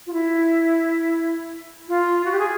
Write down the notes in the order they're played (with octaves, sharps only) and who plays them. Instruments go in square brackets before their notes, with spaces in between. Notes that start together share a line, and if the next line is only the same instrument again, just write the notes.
[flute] F4
E4
F4
F#4
G4
G#4